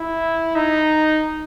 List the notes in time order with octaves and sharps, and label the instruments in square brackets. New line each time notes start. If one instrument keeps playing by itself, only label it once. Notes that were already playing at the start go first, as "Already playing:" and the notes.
Already playing: [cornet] E4
D#4